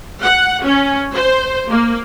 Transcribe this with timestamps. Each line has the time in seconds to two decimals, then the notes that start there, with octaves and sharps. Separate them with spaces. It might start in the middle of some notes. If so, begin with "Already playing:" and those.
0.22 F#5
0.64 C#4
1.14 C5
1.69 A#3